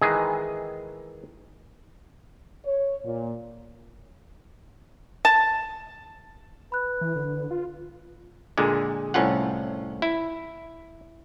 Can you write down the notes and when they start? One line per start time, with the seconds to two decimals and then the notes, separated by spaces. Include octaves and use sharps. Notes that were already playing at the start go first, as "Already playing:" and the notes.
0.02 D#3 E3 G#3 G#4
2.65 C#5
3.05 A#2
5.25 A5
6.72 B4 B5 F#6
7.01 E3
7.16 D3
7.51 F4
8.58 A#2 D3 G#3
9.14 C2 A2 C#4 F4 F#5
10.02 E4